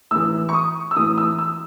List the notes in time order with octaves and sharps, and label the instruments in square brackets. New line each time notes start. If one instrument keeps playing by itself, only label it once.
[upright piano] A2 E3 E6
C#6
D#6
E6
A2 E3 D#6
D#6
E6
E6